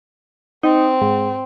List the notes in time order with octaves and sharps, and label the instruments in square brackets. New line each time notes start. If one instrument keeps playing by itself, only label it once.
[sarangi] C4 [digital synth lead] D#4
[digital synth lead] G#2